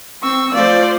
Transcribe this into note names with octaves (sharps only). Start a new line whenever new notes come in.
C4 C#6 E6
F3 A3 F4 C5 D5 F5